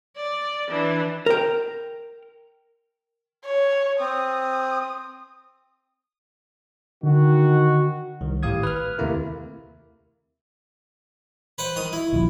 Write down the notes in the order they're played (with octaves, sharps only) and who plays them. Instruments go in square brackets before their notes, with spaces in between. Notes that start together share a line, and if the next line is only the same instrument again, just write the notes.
[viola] D5
E3 D4
[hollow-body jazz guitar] A#4 G5
[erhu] C#5
[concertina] C4 [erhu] D#6
[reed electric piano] D3 [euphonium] D#3 [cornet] F#4
[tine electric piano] C2 D#3
G#1 A2 G4 F5 D#6 G#6
B4 F6
D#2 C3 A3 A#3 E4 A#4
[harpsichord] B4 C5 F#5
D#3 D#6
E4
[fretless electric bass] A#1 D#2 F3